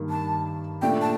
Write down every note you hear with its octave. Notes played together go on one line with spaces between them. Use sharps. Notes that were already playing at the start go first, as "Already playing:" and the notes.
Already playing: G2 D#3 A#3
A5
A#2 A3 D4 G5
A5